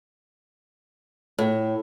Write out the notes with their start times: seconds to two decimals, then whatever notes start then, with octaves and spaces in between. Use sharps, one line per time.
1.38 A2